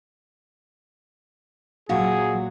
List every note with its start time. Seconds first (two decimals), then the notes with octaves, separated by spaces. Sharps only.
1.89 A#2 F#3 F#4 G#4 F5 F#5